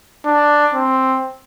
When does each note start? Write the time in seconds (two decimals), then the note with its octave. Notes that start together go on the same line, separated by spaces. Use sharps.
0.25 D4
0.74 C4